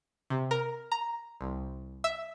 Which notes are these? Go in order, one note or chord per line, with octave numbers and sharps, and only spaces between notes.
C3
A#4
A#5
C2
E5